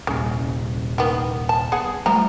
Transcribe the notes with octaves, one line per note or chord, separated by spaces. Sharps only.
D#1 C2 C#3
D#3 A#3 B3
A5
B3 G#4 F#5
F3 G3 A3 A#5